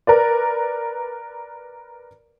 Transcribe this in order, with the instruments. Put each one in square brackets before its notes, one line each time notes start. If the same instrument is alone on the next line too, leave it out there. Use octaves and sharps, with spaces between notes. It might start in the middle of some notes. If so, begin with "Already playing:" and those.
[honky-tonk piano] A#4 B4 D5